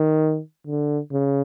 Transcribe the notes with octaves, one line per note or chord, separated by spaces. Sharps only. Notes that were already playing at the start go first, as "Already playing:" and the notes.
Already playing: D#3
D3
C#3